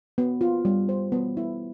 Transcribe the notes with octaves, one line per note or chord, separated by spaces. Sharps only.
B3
F4
G3
C5
B3
E4